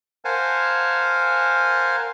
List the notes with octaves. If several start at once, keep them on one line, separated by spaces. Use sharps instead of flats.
A#4 C5 F5 F#5 G#5 A5